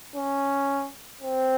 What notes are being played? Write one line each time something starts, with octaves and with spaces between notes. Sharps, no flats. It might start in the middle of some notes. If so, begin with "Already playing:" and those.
C#4
C4